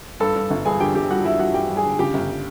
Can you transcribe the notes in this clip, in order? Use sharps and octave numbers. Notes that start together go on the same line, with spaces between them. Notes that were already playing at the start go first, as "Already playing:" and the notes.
G2 A4 A5
G2
G1
G2 G#4 G#5
D3 G4 G5
G1 G4 G5
G3 F#4 F#5
G2 E4 E5
G3 F#4 F#5
G2 G4 G5
G3
G#4 G#5
D3
C#3 G4 G5
G1